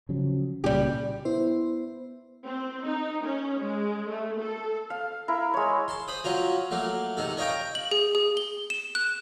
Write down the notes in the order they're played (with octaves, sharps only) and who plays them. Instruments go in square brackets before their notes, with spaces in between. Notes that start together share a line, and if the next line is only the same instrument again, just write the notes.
[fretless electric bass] C#3 F3 F#3
[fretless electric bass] C2 A#2 C#3 [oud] G3 G4
[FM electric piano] B3 E4 C5
[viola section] C4
D#4
C#4
G#3
A3
A4
[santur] F5
E4 A#4
G#3 C#5
[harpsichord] A5 C6
C5 B5 D#6
F#3 C#4 F4 A#4
F#3 A3 A#3
C3 D#3 A4
A#4 C#5 D#5 F5 G5 A#5
[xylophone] F#7
G#4
G#4
G7
E7
F#6